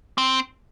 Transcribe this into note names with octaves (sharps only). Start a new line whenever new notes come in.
C4